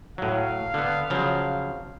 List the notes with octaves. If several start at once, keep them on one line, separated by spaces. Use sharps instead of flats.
A2 F#3 F5
D3 B3
C#3 F3 F#3